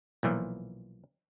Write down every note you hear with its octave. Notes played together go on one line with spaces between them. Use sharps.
B1 A#2 E3 F3